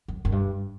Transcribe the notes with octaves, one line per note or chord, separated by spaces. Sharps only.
F#2
F#2
G2